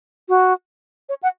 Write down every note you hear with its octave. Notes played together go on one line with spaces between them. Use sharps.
F#4
C#5
F#5